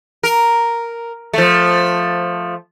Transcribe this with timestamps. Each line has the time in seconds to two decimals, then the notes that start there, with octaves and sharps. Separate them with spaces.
0.23 A#4
1.33 F3 A3